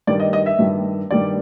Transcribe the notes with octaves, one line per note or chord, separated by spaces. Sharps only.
G2 D#3 G3 D5
D#5
D#5
E5
G2 D#3 G3
G2 D#3 G3 D5